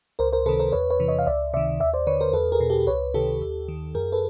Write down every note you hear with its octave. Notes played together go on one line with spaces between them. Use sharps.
C#2 A#4 C5
A#4 C5
C3 D#3 A4 B4
A#4 C5
E2 B4 C#5
B4 C#5
C3 E3
C#5 D#5
F5
C#2 D5 E5
C3 D#3 D5 E5
D#2 D5 E5
C5 D5
D3 B4 C#5
A#4 C5
E2 A4 B4
G#4 A#4
B2
G4 A4
C#2 B4 C#5
C3 D#3 G4 A4
D#2
D#3
F#2 G#4 A#4
A4 B4